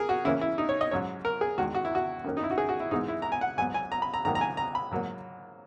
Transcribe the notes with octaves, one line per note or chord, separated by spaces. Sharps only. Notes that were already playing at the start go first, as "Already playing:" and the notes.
Already playing: G#4 A#4
F#4
C#3 E3 A#3 C#4 E4
E4
D#4
C#5
D#5
G#2 F#3 C#4 C#5
A#4
G#4
E2 D#3 G#3 F#4
F#4
E4
F#4
F#2 D#3 A#3 C#4
D#4
E4
F#4
G#4
F#4
E4
G#2 E3 G#3 B3 D#4
E4
A#5
G#5
F#5
G#2 F#3 B3 G#5
G#5
A#5
B5
A#5
G#2 D#3 F#3 A#3 A#5
A#5
G#5
A#5
B5
G#2 F#3 A#3